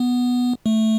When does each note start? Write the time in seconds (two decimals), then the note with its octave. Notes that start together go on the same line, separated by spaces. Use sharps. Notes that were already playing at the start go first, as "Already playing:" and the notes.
Already playing: B3
0.66 A3